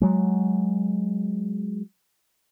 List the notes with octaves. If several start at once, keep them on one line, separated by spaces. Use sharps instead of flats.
F#3 G#3